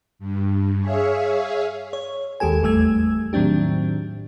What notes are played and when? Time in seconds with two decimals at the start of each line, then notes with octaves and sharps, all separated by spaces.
0.19 G2
0.80 G#4 C#5 E5 F5
1.93 C#5
2.40 D#2 G#3 G4 A4 G#5
2.62 G#1 E2 G3 A3 E6 G#6
3.33 A2 D#3 F#3 C4 D4 G4